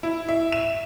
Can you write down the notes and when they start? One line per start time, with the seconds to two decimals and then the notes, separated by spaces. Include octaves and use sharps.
0.03 E4
0.29 E5
0.52 E7